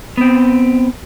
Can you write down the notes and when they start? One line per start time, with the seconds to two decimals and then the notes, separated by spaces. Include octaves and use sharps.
0.17 B3 C4